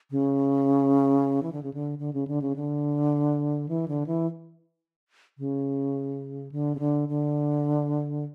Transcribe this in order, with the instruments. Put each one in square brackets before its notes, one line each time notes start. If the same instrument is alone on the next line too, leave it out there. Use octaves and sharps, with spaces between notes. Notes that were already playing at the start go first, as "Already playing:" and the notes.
[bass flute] C#3
E3
D3
C#3
D3
D3
C#3
D3
C#3
D3
E3
D3
E3
C#3
D3
C#3
D3
D3